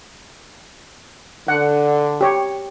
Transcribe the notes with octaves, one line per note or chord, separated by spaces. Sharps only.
D3 F#5
G4 C#5